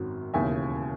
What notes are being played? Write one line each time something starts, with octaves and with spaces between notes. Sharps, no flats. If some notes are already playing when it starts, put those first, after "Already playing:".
Already playing: G#1 F#2 D#3 F#3
E1 D#2 C#3 E3 E5 G#5